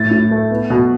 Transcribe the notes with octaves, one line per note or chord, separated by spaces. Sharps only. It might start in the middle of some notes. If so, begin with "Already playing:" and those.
Already playing: A2 A6
A2
A3
B3
B2